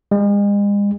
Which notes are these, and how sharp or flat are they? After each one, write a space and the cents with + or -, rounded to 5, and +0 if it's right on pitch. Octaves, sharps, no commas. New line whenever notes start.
G#3 -40